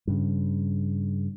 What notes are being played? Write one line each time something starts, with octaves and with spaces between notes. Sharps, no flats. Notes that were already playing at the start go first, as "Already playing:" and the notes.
G2 C#3